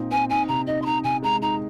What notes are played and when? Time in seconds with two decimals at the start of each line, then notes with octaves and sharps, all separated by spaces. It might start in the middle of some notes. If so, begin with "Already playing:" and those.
Already playing: A#2 C4 D#4
0.11 C4 G#5
0.30 D#4 G#5
0.48 C3 A#5
0.67 D#4 D#5
0.82 C6
0.86 D#4 A#5
1.04 C3 G#5
1.23 G#3 A#5
1.42 D#4 A#5